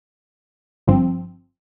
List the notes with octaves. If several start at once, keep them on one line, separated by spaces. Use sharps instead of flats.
G1 G2 F3 C4